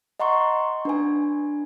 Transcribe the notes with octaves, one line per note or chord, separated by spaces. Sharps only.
D#5 F#5 A#5 C6 C#6
D4 B4 G#5